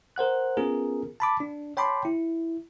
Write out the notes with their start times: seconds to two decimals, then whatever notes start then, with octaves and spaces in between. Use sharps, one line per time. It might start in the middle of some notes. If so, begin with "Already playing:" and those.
0.16 A#4 C5 F#5 F#6
0.57 B3 C#4 F4 G#4 A#4
1.20 A5 B5 D6
1.40 D4
1.77 C#5 G5 A5 B5 C6 D6
2.05 E4